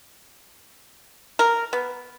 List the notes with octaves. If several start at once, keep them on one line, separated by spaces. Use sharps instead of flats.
A#4
B3